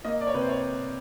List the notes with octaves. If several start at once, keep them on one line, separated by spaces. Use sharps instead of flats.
A#3 D#5
D5
C#5
C3 B4
C5
C#5